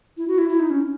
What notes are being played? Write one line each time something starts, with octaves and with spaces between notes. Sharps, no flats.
E4
F#4
E4
E4
D#4
C#4